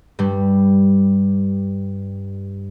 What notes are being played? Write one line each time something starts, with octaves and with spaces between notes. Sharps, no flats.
G2 G3